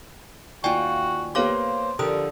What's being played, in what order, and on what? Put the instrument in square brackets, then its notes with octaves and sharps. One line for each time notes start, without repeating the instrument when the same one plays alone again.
[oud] D#2 F4 [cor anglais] F#4 [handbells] D5 G5 G#5
[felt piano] A#3 B3 G4 [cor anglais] C5 [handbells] C#5 F5 D6
[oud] D3 F3 G4 [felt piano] A#4 [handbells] D#6